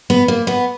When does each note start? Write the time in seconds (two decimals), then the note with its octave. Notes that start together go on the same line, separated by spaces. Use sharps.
0.10 B3
0.28 A#3
0.47 B3